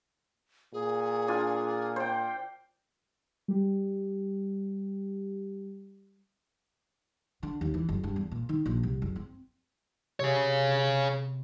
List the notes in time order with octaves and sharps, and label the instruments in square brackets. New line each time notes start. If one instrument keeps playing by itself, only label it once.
[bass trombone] A#2 [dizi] G#4
[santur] D4 F4 G#5
C5 G5
[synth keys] G3 G4
[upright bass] D3
D#2
E3
F#1
G2
E2
A#2
D#3
A#1
C2
F#1
C4
[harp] C3 [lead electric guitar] G#4 C#5